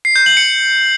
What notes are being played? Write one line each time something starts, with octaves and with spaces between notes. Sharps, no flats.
C7
G6
F#7
C#7